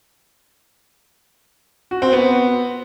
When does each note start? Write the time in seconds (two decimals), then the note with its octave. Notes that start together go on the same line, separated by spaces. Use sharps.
1.91 F#4
2.02 C4
2.13 B3